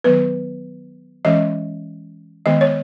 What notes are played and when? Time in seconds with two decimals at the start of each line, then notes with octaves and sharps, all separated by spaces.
0.04 D#3 F#3 B3 B4
1.25 E3 G#3 C#4 D#5
2.46 D#3 G#3 B3 D#5
2.61 C#5